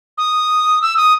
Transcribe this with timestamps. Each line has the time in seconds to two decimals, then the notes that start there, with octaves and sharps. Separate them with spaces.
0.18 D#6
0.82 E6
0.97 D#6